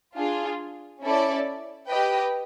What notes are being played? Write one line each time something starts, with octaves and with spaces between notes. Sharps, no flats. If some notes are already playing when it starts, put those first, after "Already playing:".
D4 F4 G#4
C#4 E4 A4 D5
G4 B4 D#5 G5